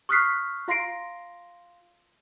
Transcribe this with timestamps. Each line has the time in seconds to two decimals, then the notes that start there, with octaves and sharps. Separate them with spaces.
0.09 C#6 D#6 F6 F#6 B6 C7
0.68 F4 F5 C6 A#6 C7 D7